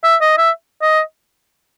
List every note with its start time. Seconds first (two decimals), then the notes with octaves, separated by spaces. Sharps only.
0.04 E5
0.21 D#5
0.38 E5
0.82 D#5